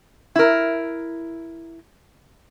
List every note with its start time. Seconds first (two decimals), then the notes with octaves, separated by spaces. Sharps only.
0.36 E4 A#4